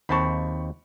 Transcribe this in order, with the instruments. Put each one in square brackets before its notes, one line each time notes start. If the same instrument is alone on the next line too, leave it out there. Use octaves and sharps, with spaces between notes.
[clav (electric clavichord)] D#2 C4 A5 [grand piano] B5 C#6